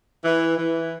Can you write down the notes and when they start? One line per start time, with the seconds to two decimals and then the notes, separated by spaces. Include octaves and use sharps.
0.25 E3
0.58 E3